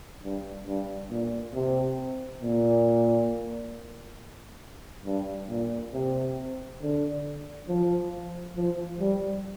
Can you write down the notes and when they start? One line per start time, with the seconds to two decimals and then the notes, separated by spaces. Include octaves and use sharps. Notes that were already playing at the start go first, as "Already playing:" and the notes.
0.23 G2
0.66 G2
1.10 A#2
1.55 C3
2.42 A#2
5.05 G2
5.49 A#2
5.93 C3
6.81 D3
7.68 F3
8.56 F3
9.00 G3